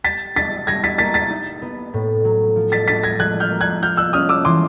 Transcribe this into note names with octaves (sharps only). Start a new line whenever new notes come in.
G4 A6 B6
D4 A6 B6
G3 G#6 A#6
A6 B6
A#3 A6 B6
A6 B6
D#4
B3
A2
F#3
F3
A6 B6
D4 A6 B6
G#6 A#6
F3 F#6 G#6
F6 G6
A#3
F#6 G#6
F4 F6 G6
E6 F#6
C#4 D#6 F6
D6 E6
E3 C6 D6